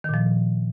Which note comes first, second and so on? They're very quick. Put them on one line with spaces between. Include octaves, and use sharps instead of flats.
D#3 A#2 F3